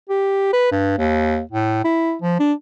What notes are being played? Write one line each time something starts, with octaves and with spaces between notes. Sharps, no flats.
G4
B4
G2
D#2
A2
E4
F3
D4